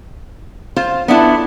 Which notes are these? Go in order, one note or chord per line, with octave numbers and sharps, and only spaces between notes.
F4 C5
B3 D4 E4 A4